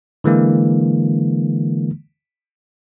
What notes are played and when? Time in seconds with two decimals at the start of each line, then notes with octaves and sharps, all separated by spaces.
0.24 D3 E3 G#3 A#3